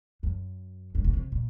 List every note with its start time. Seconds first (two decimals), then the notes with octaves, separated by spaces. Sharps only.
0.23 F#2
0.95 G2
1.04 B2
1.13 C3
1.32 A#2